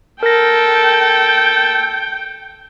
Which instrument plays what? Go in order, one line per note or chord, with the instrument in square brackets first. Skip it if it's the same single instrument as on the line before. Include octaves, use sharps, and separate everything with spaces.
[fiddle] A4 [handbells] A#4 A#6 [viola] G5